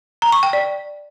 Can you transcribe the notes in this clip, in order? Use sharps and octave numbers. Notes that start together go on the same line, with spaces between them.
A#5
C#6
G5
D5